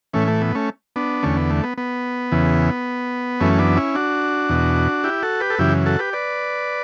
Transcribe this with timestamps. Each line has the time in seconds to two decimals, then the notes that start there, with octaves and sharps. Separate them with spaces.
0.14 A2 E3 A3 C#4
0.28 A3
0.41 B3
0.55 A3 C#4
0.96 B3 D4
1.23 E2 D3 A3 C#4
1.37 B3
1.50 A3
1.63 B3
1.78 B3
2.32 E2 C#3 E3
3.40 F#2 E3 A3 C#4
3.59 B3 D4
3.77 C#4 E4
3.95 D4 F#4
4.50 E2 B2
5.04 E4 G4
5.23 F#4 A4
5.40 G4 B4
5.50 A4
5.59 F#2 C#3 E3 E4 G4
5.86 F#4 A4
5.99 G4 B4
6.13 B4 D5